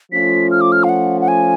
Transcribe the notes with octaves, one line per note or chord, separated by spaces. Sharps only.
F3 A3 C#4 F4 B6
F6
D6
F6
F5
F#5
F#5
G#5